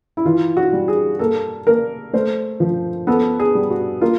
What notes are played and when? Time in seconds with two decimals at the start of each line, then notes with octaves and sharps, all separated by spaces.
0.17 E4
0.25 E3 F4
0.57 F#4
0.73 G3
0.88 G#4
1.19 A#3 A4
1.67 A#3 A#4
2.13 A3 C5
2.60 F3
3.07 B3 A4
3.40 G#4
3.55 G3
3.71 F#4
4.01 A#3 F4